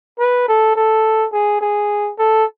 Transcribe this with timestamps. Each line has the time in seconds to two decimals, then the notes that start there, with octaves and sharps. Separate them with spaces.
0.19 B4
0.48 A4
0.75 A4
1.32 G#4
1.61 G#4
2.18 A4